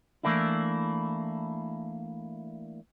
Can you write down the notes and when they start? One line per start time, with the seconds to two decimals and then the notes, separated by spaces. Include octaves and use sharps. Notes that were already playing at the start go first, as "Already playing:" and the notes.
0.23 E3 A3 A#3 D4 E4